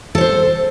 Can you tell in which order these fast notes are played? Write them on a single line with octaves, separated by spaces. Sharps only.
A4 C#5 C5